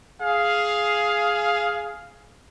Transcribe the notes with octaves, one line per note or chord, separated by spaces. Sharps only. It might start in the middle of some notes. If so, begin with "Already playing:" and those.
G#4 F5